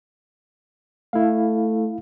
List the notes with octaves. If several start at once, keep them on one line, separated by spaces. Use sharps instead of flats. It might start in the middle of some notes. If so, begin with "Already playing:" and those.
A3 E4 F5